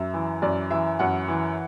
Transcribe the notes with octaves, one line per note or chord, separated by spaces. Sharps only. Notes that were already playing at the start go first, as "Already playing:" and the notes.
Already playing: F#2 E5
E3
F#2 D5
E3 E5
F#2 F#5
E3